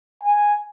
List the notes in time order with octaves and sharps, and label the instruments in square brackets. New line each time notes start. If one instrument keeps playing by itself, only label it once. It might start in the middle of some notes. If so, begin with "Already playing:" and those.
[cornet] G#5